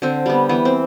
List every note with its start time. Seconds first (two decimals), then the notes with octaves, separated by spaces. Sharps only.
0.02 D3 C4
0.26 G3 B3
0.49 E3 B3
0.65 C4